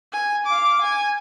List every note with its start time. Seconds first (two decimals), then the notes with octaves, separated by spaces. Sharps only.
0.12 G#5
0.46 F5 D6
0.82 G#5